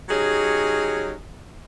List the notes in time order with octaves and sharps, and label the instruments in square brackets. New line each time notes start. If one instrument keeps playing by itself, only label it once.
[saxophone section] F#3 C#4 D#4 G4 G#4